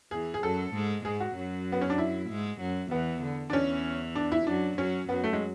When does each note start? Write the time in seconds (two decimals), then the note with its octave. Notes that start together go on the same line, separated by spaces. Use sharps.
0.11 E2 E3 G#4
0.34 G#4
0.43 F#2 F#3 A4
0.74 G#2 G#3
1.05 G#2 G#3 G#4
1.20 F#4
1.36 F#2 F#3
1.72 B3
1.81 C#4
1.90 D4
1.98 E4
2.29 G#2 G#3
2.60 F#2 F#3
2.91 E2 E3 B3
3.22 D3
3.50 D4
3.53 E2 E3 C#4
4.16 D4
4.32 E4
4.46 F#2 F#3 D4
4.78 F#2 F#3 C#4
5.08 F#2 F#3 B3
5.24 A3
5.33 G#3